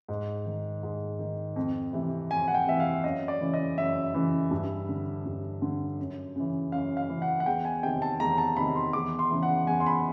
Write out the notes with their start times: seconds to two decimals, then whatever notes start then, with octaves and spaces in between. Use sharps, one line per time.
0.08 G#2
0.46 D#3
0.83 G#2
1.19 D#3
1.56 F2
1.93 C3 E3
2.31 F2 G#5
2.48 F#5
2.55 G5
2.67 C3 E3 E5
2.80 F5
3.04 F#2 D#5
3.28 D5
3.41 C#3 E3
3.54 D#5
3.78 F#2 E5
4.14 C#3 E3
4.51 G2
4.89 D3
5.25 G2
5.62 D3
5.99 F#2
6.36 C#3 E3
6.72 F#2 F5
6.97 F5
7.09 C#3 E3
7.22 F#5
7.40 F#5
7.46 E2 G5
7.65 G#5
7.83 C3 D#3 G5
8.02 A5
8.20 E2 A#5
8.38 A5
8.57 C3 D#3 B5
8.76 C6
8.93 E2 D6
9.19 C6
9.31 C#3 E3
9.43 F#5
9.67 E2 G#5
9.80 C6
9.86 B5